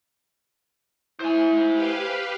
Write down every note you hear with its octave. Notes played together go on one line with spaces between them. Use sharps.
E4 C5 G#5
G4 B4 F5